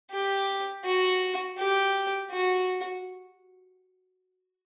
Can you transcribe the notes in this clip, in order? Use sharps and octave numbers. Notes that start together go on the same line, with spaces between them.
G4
F#4
G4
F#4